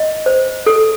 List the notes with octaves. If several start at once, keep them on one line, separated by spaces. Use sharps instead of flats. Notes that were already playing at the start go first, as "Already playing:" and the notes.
Already playing: D#5
C5
A4